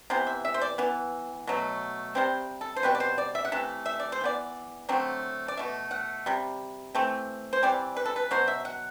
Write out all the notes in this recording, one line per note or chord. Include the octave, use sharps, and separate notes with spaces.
C3 E3 B3 C5
E5
E5
C5
D5
E3 B3
B2 F#3 A3
C3 G3 C4 C5
A4
C5
B2 G3 C4 B4
D5
C5
D5
E5
F#5
C3 E3 A3 E5
E5
D5
C5
E3 B3 D5
D3 F#3 A3 C4
D5
B2 A3 E5
F#5
C3 G3
E3 A3 C4
C5
E3 G3 C4 D5
B4
A4
B4
B2 F#3 C5
E5
F#5